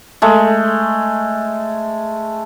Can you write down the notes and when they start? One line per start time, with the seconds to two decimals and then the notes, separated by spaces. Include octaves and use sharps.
0.22 G#3 A3